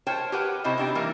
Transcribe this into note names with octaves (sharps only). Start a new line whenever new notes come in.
A#4 C5 C#5 G5 A5
G4 A#4 B4 C#5 F#5
C3 E4 F#4 C5 D#5
B3 C4 D4 D#4 G4
E3 G3 A#3 A#4